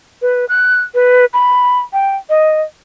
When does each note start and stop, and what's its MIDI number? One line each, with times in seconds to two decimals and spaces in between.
0.22 0.45 71
0.49 0.81 90
0.95 1.25 71
1.33 1.80 83
1.93 2.16 79
2.29 2.62 75